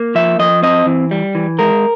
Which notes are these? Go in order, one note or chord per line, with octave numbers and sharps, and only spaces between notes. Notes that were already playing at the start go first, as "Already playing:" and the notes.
Already playing: A#3
F3 E5
F3 D#5
C4 D#5
E3
G3
E3
G#3 A#4